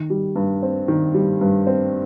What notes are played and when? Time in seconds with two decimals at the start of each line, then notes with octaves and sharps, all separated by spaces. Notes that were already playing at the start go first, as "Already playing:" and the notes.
Already playing: D#3
0.10 G3
0.36 G2
0.63 C4
0.88 D#3
1.14 G3
1.41 G2
1.67 C4